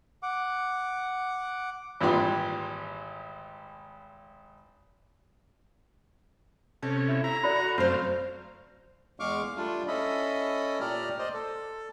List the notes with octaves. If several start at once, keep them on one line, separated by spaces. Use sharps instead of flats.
F#5 D6
G#1 A#2 E3 G3 G4 C6
C3 C#4 A4
E4 E5 F5
E4 A#5
F#4 A4 D5 B5
F#2 A3 C4 F#4 C5 F5
E2 G#3 F5 C#6 D6 F6
G3 A3 D4 F4
C#4 E4 A4 D#5 B5
A#2 G4 D5 A#5 F6
C5 D5 D#5
A4